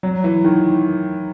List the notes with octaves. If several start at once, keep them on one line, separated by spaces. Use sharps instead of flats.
F#3
E3
D#3